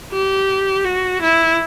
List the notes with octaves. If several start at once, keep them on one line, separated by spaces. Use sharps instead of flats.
G4
F#4
E4